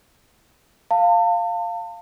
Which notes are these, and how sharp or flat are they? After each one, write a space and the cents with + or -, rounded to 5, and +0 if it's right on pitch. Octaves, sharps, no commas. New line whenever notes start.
F5 +0 A5 +35